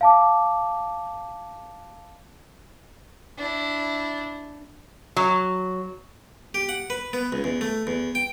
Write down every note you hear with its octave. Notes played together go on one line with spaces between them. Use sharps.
F5 A5 D6
D4 E4
F#3
G4
F#5
B4
B3
C#2
E2
A3
E2
G5